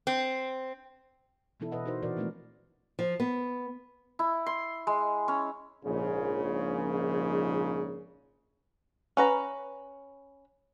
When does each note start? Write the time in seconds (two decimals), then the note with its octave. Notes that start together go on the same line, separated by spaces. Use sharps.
0.07 C4
1.60 B2 E3 B3 D4 E4 A4
1.72 B2 B4 D#5 F#5
1.86 D#4 F#4 A#4 C5
2.02 A#2 E3 F#4 A#4 D5
2.17 F3 G#3 A3 B3 C4 D4
2.99 F3
3.20 B3
4.19 E4
4.46 C6
4.87 G#3
5.28 C#4
5.84 A#1 G#2 C#3
9.17 C#4 B4 A#5